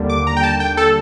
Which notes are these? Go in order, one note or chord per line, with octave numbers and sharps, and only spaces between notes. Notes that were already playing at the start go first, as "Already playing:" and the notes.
Already playing: D#2 D3 G3 A#3 D4
D6
A#5
G5
A5
G5
A4